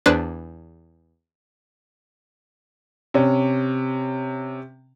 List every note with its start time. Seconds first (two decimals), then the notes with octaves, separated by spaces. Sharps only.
0.06 E2 D4 B4 C5 F#6 A6
3.14 C3 C#4